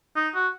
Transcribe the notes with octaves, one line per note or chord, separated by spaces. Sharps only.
D#4
F#4